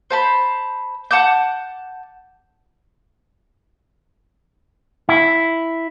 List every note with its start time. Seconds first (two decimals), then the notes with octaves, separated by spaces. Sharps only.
0.10 C5 A5 B5
1.11 F#5 A5 D6 G6
5.09 E4